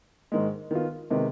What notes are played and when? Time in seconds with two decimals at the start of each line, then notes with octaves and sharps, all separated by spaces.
0.32 G#2 D#3 G#3
0.71 D#3 B3 F4
1.11 C3 D#3 G#3 B3